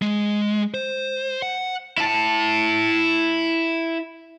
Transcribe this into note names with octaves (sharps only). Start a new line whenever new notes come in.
G#3
C5
F#5
E4 A5